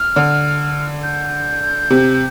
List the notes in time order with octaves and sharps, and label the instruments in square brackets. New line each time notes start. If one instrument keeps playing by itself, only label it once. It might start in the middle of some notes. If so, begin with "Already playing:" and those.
Already playing: [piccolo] F6
[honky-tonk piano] D3
[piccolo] G6
[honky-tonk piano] C3